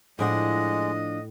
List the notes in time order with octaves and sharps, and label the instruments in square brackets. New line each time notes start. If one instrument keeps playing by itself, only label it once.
[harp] A2 [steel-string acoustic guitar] F3 D4 F#5 [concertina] G#3 [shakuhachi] D#5